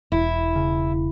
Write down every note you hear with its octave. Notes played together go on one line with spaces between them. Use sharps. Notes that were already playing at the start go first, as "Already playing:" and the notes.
E1 E4
C#3